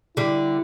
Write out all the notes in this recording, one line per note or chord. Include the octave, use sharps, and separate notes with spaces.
D3 G3 E4